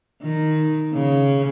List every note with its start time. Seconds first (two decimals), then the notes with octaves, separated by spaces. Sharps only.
0.23 D#3
0.94 C#3